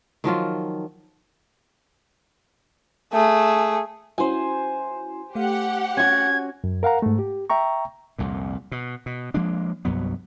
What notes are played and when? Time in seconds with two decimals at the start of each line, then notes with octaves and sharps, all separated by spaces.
0.24 D#3 F3 F#3 F4
3.13 A3 G#4
4.18 C#4 E4 F#4 C5 G#5
5.35 A3 G4 F5 F#5
5.97 C#4 F#4 G#6
6.64 F#2
6.83 A#4 F5 F#5 A#5
7.02 G#2 A3
7.19 G4
7.50 E5 G5 A#5 C#6
8.18 C2 F2 A#2
8.72 B2
9.06 B2
9.34 F3 G#3 A#3 D4
9.85 C2 G2 F#3 B3